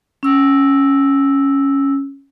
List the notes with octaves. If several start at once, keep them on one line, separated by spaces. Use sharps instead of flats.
C#4 E6